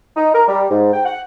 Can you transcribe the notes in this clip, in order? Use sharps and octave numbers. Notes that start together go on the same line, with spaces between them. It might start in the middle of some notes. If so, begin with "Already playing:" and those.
D#4
A#4
G3
G#2
G5
F#5